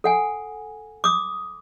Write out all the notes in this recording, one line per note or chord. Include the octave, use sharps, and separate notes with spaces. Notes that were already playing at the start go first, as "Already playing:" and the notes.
A4 F#5 G#5
D6 D#6